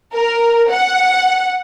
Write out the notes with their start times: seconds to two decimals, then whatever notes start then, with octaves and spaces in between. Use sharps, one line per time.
0.13 A#4
0.69 F#5